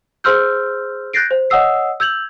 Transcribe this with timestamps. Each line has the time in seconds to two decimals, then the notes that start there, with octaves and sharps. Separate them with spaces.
0.24 G#4 C5 C6 E6 F6 G6
1.13 F#6 G6 A6 A#6 C7 D7
1.31 C5
1.50 C#5 D#5 F#5 D#6 E6 C7
2.00 E6 G6 G#6 F7 F#7